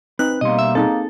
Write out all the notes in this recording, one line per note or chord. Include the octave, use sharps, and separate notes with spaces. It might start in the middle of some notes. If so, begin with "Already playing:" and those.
C4 D#4 B4 F#6
B2 G3 A#3 D#5 C6
E5
C4 D#4 G#4 A4